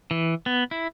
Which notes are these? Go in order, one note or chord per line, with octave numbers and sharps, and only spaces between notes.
E3
B3
E4